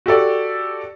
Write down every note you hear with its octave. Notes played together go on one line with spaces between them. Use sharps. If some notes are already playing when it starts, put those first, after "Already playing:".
F#4 G4 A4 D5